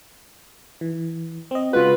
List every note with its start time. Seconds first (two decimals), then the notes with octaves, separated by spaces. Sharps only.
0.81 E3
1.51 C4 D#5
1.73 C#3 G#3 F4 F#4 B4